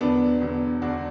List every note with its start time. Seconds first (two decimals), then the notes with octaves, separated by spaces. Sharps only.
0.01 E1 E2 D3 F#3 B3 D4
0.41 E1 E2 D3 F#3
0.82 E1 D2 D3 D4 F#4